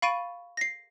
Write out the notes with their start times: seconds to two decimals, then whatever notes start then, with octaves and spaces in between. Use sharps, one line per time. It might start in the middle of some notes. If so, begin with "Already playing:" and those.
0.02 F5 B5 C#6 A6 D7 D#7
0.57 A#6 C7